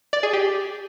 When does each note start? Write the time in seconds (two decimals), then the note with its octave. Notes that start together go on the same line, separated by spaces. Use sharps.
0.13 D5
0.23 G#4
0.33 G4